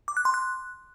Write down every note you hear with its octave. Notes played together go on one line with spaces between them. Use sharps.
D6
F#6
C6
F#6